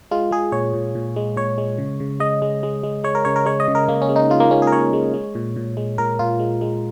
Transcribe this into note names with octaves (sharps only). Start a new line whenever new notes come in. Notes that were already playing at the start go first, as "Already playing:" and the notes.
G#3 F4
G#3 G#4
A#2 C#5
A#2
A#2
G#3
A#2 C#5
G#3
C#3
C#3
G#3 D#5
G#3
G#3
G#3
G#3 C#5
A#4
C#3 C#5
A#4
G#3 C#5
D#5
C#3
A#4
C#3 A#3
C#4
G#3
D#4
G#3 F4
A#3
G#3 C#4
G#4
A#4
G#3 C#5
G#3
G#3
A#2
A#2
G#3
A#2 A#4
A#2 F4
G#3
G#3